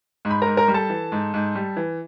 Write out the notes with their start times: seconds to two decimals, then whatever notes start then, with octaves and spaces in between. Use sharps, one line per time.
0.25 G#2
0.31 B5
0.42 G#2 A#4 A#5
0.57 A#4 A#5
0.68 G3
0.74 A4 A5
0.90 E3
1.12 G#2
1.34 G#2
1.55 G3
1.76 E3